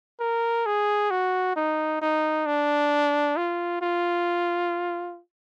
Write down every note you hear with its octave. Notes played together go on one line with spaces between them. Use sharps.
A#4
G#4
F#4
D#4
D#4
D4
F4
F4